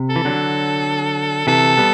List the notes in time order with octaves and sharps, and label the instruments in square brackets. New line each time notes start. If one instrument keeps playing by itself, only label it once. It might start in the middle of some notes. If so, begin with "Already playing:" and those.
Already playing: [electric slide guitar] C3
[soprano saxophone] A4
[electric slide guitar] E3
D3 F#3
[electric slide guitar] C3 E3 [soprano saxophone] A4
[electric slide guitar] G3 B3